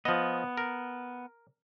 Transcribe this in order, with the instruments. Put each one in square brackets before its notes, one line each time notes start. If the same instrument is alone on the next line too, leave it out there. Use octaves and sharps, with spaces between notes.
[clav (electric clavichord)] F3 D#5 [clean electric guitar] B3
[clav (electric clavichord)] A#4